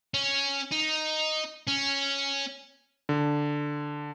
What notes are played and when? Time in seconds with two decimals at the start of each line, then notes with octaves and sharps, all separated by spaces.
0.14 C#4
0.71 D#4
1.67 C#4
3.09 D3